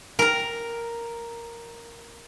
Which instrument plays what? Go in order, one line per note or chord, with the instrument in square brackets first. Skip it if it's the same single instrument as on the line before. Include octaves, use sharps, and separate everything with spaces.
[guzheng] A#4 A#5